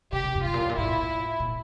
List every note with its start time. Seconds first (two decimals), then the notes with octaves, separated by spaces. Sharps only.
0.13 C3 G4
0.24 C3
0.35 F2
0.45 A2 F4
0.54 A#2
0.61 A2
0.70 A#2
0.77 A2 E4
0.87 A#2
0.95 A2
1.40 A#2